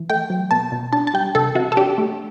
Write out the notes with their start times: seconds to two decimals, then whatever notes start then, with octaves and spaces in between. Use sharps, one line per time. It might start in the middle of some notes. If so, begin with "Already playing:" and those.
Already playing: E3
0.10 A3 G5
0.30 F#3
0.51 B2 A5
0.72 B2
0.93 D4 A5
1.07 A5
1.14 G3 G5
1.35 C3 A4
1.55 C3 F#4
1.72 A4
1.77 D4 G4
1.98 A3